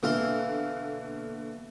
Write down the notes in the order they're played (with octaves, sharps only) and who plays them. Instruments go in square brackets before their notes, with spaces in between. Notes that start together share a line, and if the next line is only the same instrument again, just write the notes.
[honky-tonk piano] B2 D3 A#3 [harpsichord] E3 F5 C6